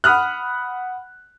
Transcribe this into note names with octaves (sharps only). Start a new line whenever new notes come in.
F#5 B5 D#6 F6 F#6